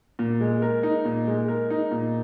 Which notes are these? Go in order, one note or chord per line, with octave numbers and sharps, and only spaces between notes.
A#2
G#3
A#4
D#4
A#2
G#3
A#4
D#4
A#2